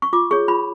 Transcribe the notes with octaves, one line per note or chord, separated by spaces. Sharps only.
C#6
F4 D6
G#4 C#5 C#6
F4 B5